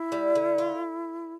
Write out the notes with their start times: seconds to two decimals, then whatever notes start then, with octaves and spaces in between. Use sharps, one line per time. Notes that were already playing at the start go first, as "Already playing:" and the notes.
Already playing: E4
0.12 G3
0.35 D3
0.58 F4